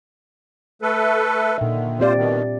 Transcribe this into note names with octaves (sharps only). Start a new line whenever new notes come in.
A3 A4 B4
A#2 D3 D#3 E5
C4 F4 G4 C5 D5
B2 D#3